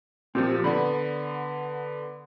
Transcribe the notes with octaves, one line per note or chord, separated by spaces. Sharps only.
A#2 F3 C4 G4
D3 B3 D5 B5